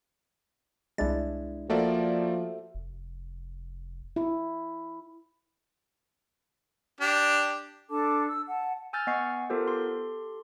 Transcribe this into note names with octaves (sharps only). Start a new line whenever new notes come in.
C2 G#3 D4 E4 A6
F3 A3 A#3 F#4 A4 D5 E5
F1
E4
D4 G4
D4 A4 A5 D6
E6
F#5 A5
G#5 E6 F6 G6 A6
B3 D#5 F#5 G#5 C#6 C7
B3 F4 G4 A4 A#4 C5
G4 A4 C6